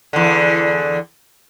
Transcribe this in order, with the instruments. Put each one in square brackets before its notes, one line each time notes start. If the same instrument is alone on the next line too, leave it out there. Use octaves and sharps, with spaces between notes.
[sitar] E2 D3